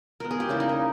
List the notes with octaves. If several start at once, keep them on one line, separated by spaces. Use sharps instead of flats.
B2 G#3 B3 A#4
G#4
G4
C#3 G3 A#3 E4
D#4
A#4